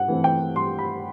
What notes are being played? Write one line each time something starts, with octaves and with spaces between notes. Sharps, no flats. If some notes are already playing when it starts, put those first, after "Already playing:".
Already playing: G2 F#5
E3 A3 C4
G5
G2 C6
B5